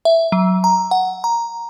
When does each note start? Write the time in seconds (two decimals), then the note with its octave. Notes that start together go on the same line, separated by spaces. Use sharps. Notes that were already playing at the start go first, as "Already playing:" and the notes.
0.05 E5
0.32 F#3
0.64 A#5
0.91 F#5
1.24 A#5